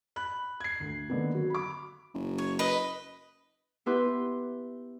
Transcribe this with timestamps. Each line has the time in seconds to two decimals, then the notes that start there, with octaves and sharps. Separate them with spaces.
0.16 B5 F#6
0.60 G#6 C7
0.80 D2
1.10 D3 D#3 A#3 B3
1.35 F#3
1.50 B5 D6
2.14 F#1
2.38 C#5
2.59 B4 D#5
3.86 B3 E4 G4 B4 C6 G6